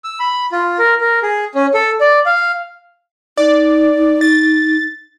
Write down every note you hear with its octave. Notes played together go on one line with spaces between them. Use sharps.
E6
B5
F4
A#4
A#4
G#4
C#4
A4
D5
F5
D#4 D5
A6